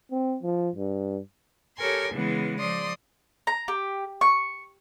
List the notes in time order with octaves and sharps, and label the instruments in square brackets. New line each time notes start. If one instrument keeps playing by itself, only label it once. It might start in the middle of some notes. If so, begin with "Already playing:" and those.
[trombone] C4
F3
G2
[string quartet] G4 A4 A#4 C#5 G#5 C6
C#3 E3 G#3 B3
F3 D5 C6 D#6
[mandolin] A#5
G4
C#6